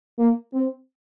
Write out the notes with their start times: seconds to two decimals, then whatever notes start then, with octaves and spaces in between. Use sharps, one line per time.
0.18 A#3
0.54 C4